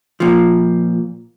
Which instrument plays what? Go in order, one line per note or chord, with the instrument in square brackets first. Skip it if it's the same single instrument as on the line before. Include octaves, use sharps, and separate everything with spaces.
[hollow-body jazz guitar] A#2 F3